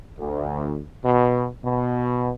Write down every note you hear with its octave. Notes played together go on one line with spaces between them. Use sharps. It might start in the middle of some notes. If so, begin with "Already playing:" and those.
D2
B2
B2